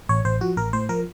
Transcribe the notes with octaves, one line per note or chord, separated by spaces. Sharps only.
A1 C#5
A1 C5
F3 F#4
A1 A#4
A2 C5
F3 A#4